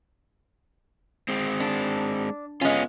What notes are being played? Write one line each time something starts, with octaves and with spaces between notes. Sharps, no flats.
G#3 C4
D4
G#3 B3 C#4 F4